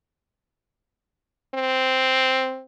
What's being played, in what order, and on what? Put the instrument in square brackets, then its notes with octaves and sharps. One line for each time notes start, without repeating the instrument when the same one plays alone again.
[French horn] C4